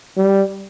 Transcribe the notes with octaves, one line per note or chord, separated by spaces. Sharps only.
G3